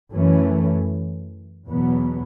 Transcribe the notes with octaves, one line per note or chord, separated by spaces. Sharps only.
F#2 E3 A3 C#4
E2 B2 F#3 B3